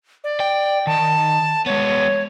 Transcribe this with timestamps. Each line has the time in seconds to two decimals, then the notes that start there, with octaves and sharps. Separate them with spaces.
0.24 D5
0.40 G5
0.87 D#3 A5
1.66 G#3 B3 C#5